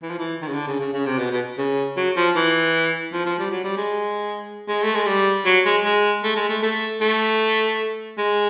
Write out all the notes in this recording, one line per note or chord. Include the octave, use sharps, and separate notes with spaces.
E3
F3
E3
D#3
C#3
D3
C#3
C#3
C#3
C3
B2
B2
C#3
F#3
F3
E3
F3
F3
G3
F#3
G3
G#3
G#3
A3
G#3
G3
F#3
G#3
G#3
A3
G#3
A3
A3
A3
G#3